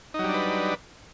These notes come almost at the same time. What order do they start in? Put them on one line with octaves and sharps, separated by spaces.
D#4 F#3 G3 D4 B4